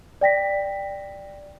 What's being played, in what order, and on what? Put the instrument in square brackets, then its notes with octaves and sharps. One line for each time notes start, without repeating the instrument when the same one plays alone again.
[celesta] D5 G5 A#6 B6